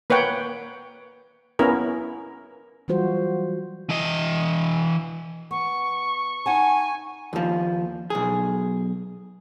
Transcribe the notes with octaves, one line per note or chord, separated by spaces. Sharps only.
A#3 B4 C#5 F#5 G5
B3 C#4 E4 A#4
E3 F#3 G3 F4 F#4 C5
E3 D#5
B3 C#6
D#4 F#5 G#5 A5
D#2 F3
B1 G#4